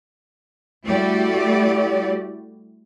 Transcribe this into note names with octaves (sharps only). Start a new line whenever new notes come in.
G3 A3 E4 F#4 G4 D5